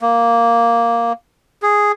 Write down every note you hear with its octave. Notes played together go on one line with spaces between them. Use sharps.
A#3
G#4